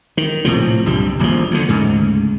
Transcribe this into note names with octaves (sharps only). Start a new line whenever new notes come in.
D#3
A#1 A2 C3 F3
F#1 C2 G2 G3
D#1 A#1 A2 F3
D2 D3
D2 G#2 C#3